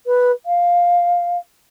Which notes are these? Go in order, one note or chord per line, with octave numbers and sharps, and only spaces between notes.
B4
F5